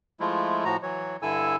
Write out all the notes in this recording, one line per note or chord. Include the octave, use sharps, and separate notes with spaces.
F3 G#3 A3 E4 F4
A2 F3 F#4 A#5
E3 F#3 C#5
G2 D3 E4 A4 G#5 E6